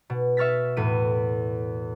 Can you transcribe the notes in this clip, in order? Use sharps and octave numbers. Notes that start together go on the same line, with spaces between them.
B2
E5 C#6 F6 A6 B6
E2 A2 B6 D#7